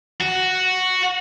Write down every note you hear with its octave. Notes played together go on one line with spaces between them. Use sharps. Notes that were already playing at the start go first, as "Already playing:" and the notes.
F#4